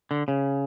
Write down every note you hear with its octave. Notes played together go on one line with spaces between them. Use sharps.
D3
C#3